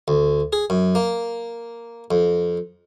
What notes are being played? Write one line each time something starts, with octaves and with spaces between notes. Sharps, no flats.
D2
G#4
F#2
A#3
F2